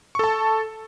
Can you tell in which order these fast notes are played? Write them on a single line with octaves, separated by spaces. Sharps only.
C#6 A4 A5